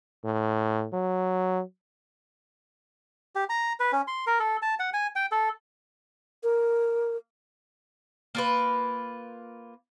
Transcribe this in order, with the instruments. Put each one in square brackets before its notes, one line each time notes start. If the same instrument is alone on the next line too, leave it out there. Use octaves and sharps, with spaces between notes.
[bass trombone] A2
F#3
[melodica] G4
A#5
B4
C#4
C6
A#4
A4
A5
F#5
G#5
G5
A4
[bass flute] A#4
[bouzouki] A#3 F4 B4